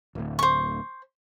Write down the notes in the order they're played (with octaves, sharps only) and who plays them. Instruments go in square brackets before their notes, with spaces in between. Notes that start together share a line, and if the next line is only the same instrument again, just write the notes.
[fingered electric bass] D1 D2
[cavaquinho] C5 C#6